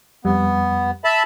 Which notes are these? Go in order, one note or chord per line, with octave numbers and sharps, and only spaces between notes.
F2 G3 B3
E5 A5 B5